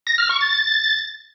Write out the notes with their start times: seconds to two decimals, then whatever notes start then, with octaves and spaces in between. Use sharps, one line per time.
0.07 A#6
0.18 F6
0.29 C#6
0.41 A6